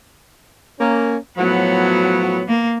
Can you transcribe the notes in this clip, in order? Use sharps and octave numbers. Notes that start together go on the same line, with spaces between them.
A#3 C#4
A2 F3 F#3 B3
A#3